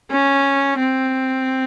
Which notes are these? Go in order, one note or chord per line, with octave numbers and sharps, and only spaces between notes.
C#4
C4